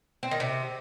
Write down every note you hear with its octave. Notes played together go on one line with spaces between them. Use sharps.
C4
D#3
C3